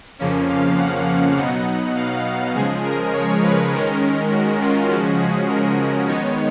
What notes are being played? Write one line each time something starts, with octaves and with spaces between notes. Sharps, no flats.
F2 C#3 F3 A#3 C#4
F5
F#5
B2 F#3 B3 D#4 F#5
F5
C#3 F3 G#3 G#4
A#4
C#5
B4
D#3 G#3 C#4 A#4
F#4
F4
C#3 F3 G#3 C#4 F#4
G#4
A#4
D#3 G#3 B3 D#4 C#5